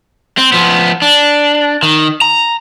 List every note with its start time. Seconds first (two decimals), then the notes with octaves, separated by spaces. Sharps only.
0.38 C4
0.52 F3 B3
1.02 D4
1.83 D#3
2.22 A#5